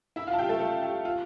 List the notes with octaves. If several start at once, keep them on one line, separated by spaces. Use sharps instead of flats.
E4 E5
F4 F5
A5
G4 G5
A3 A4
A3 A4
G4
F4